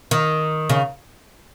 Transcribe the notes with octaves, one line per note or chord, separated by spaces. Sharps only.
D#3
C#3